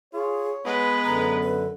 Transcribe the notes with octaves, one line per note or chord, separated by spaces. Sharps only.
F4 G#4 C#5
G#3 B3 B4 F#5
F#2 D3 A#5
B4